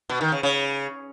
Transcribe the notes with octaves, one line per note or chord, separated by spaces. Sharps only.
B2
D#3
C#3
C#3